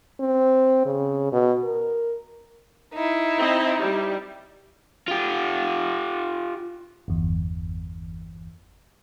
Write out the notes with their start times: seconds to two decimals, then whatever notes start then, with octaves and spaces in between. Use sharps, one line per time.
0.20 C4
0.86 C#3
1.32 B2
1.64 A#4
2.94 D#4 E4
3.37 C4 D#5
3.79 G3
5.08 F4 G4
7.08 G1 E2